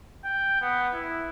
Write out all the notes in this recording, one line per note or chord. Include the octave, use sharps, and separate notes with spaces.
G5
B3
E4